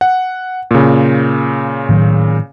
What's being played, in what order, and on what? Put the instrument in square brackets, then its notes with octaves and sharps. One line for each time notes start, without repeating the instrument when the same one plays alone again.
[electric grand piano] F#5
A#2 C#3
[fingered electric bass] A2 D#3 F#3